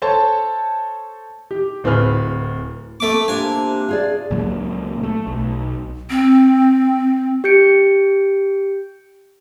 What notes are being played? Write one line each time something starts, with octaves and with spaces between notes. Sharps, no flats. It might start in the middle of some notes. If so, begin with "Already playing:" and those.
A4 C5 C#5 A5
G4
D1 C4 G#4 B4 F6
A3 D6
C3 A#3 D4 F4 G#5
F4 G#4 D5
C#2 A#2 F#3 A#3
A3
B1
C4
G4 G6 C#7 D7